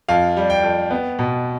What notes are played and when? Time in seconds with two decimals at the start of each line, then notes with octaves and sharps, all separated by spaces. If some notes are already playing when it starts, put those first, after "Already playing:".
0.08 F2 F5
0.37 G3
0.50 G5
0.63 F2
0.91 B3
1.19 B2